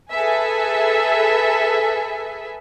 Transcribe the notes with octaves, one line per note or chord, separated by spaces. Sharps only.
G#4 A4 B4 E5 G#5